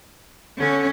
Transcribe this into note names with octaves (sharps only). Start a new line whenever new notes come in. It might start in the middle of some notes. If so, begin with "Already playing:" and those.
D3 C#4